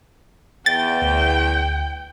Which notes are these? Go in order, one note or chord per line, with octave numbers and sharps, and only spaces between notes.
E2 G5 A6
D2